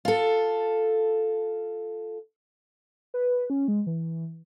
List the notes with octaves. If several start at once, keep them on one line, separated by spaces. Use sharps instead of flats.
F4 A4
B4
C#4
G#3
E3